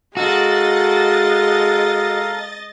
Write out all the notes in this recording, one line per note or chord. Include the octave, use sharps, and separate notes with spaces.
G#3 F#4 A4 D#5 F5 A#5 A6